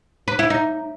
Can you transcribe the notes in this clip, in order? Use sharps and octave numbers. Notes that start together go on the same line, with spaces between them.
B4
E4
D#4